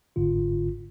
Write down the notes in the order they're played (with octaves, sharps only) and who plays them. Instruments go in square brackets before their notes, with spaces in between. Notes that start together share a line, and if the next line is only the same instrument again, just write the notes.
[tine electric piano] G1 G#2 D3 F4